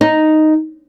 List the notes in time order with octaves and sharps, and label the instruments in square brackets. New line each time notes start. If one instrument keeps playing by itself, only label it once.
[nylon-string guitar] D#4